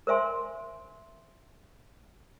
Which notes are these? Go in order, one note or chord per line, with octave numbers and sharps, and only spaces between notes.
A#4 C5 E5 G#5 C6